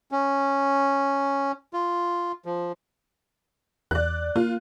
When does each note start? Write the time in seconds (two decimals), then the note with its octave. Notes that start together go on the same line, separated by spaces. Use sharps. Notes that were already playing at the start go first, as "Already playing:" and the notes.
0.12 C#4
1.73 F4
2.45 F3
3.91 E2 D5 F#6
4.36 A#3 F4